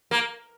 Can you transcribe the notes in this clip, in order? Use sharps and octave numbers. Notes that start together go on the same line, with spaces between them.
A#3